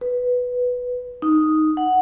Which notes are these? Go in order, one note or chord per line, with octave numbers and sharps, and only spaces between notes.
B4
D#4
F#5